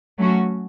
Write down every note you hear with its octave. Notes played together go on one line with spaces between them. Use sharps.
F#3 A3 C#4 F#4